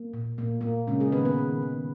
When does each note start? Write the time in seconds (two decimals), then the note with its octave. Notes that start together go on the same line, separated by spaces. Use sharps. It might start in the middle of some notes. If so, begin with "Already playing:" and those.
Already playing: A#3
0.13 A#2
0.38 A#2 A#3
0.61 A#2 A#3
0.87 C#3 G#3 C#4
1.00 G#3 G#4
1.12 D#3 B3 B4
1.25 B3 B4
1.38 D#3
1.62 D#3